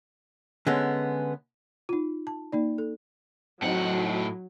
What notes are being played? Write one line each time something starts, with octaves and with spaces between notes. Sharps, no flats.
D3 G#3 B3 C#4
D#4 F4
A5
A#3 D#4 D5
A4
A2 F#3 C4 D#4 F#4 F#5